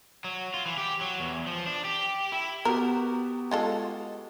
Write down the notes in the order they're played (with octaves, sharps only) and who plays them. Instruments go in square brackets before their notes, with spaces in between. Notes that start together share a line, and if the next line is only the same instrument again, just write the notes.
[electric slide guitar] F#3
F4
E3
G4
F#3
E2
F3
D4
G4
E4
[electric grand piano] B3 F#4 G4 [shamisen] A#4
[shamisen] G#3 F4 A4